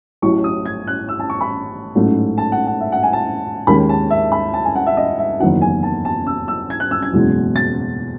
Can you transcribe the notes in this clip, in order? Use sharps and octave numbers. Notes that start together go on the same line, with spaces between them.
A1 A2 F#3 C#6
D#6
G#6
F#6
E6
A5
C#6
B5
A1 G#2 F#3 A3 C#4
A5
F#5
F#5
E5
F#5
G#5
A5
D#2 D#3 G#3 C#4 B5
A5
E5
B5
A5
G#5
F#5
E5
D#5
E5
F#1 E2 D#3 F#3 F#5
G#5
A5
A5
E6
E6
G#6
F#6
E6
G#6
F#1 E2 B2 G#3 C#4
A6